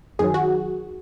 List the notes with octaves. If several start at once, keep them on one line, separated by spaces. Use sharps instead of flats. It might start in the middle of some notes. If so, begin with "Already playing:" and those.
F#2 D#3 F#3 G#4
F#4